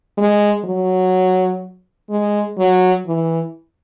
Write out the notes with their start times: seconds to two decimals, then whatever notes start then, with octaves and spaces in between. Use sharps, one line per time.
0.17 G#3
0.65 F#3
2.10 G#3
2.58 F#3
3.06 E3